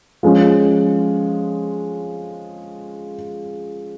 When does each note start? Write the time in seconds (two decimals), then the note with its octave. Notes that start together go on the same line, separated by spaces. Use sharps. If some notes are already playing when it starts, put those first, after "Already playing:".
0.23 F3 G#3 C#4